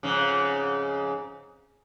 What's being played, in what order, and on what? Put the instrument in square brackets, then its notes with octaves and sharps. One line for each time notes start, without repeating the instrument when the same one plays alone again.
[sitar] F2 G#2 C#3